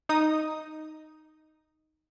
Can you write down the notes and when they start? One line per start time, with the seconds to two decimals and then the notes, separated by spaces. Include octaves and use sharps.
0.09 D#4 D#6